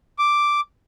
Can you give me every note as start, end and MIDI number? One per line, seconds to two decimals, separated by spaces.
0.19 0.60 86